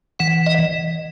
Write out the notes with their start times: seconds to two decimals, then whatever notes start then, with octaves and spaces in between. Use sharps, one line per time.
0.19 E3 F#5
0.46 D#5